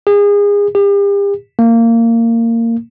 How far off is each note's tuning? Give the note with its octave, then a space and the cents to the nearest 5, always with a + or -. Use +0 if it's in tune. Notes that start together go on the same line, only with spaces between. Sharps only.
G#4 -30
G4 +40
A#3 -20